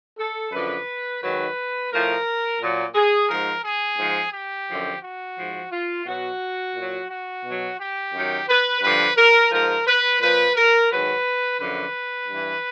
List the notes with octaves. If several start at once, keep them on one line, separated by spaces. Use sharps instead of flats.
A4
F#2 D3 F3 B4
G#2 D#3 F#3 B4
A2 F3 A#4
A#2 F#3
G#4
G#2 F3 A#4
G#4
G#2 F3
G4
F#2 D3 F3
F#4
G#2 F3
F4
B2 F#3 F#4
A#2 F#3
F#4
B2 F#3
G4
F#2 D#3 F#3
B4
G2 D3 F3 B4
A#4
G#2 F3 A#4
B4
A#2 F3 B4
A#4
G#2 D#3 F#3 B4
F#2 D3 F3 B4
G2 E3